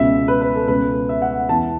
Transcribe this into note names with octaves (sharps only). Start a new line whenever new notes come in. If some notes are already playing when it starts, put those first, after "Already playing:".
Already playing: C#2 B2 E5
B4
B4
A4
C#2 B2 B4
E5
F#5
E2 E3 A5